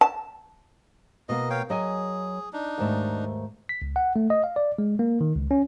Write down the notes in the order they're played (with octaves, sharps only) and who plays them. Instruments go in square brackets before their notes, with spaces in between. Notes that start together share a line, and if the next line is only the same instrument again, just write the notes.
[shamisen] A5
[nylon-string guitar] B2 A#3 [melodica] D#5
[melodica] C#5 F5 G5
[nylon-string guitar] F#3 D#5 G#5 [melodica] G#4
[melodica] D4 D#4
[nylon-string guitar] D#2 G#2 A3
[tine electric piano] B6
C#2
F#5
A3
D#5
F5
D5
G#3
A#3
D#3
C#2
C#4